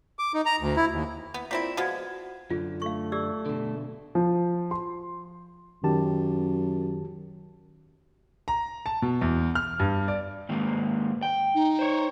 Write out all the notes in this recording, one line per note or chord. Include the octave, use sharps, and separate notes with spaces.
D6
D#4
A#5
D2
E4
D#2
B3
A#3 C4 E4 F4 D5 B6
F3 G#3 B3 F#4 F#5 G#6
F#2 D3 F4
A3 F5 C#6
G4 D5 E6
B2 D3
F3
C6
F#2 D#3 G4 A5
A#5
A5
B2
E2
F6
G2
D5
G#2 D#3 A#3
G5
D#4
C5 C#5